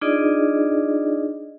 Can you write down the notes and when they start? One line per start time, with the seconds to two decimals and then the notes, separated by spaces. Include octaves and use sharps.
0.01 D4 D#4 F4 G#4 D5 D#5